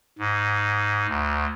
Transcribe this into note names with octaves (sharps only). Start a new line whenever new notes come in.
G#2
D2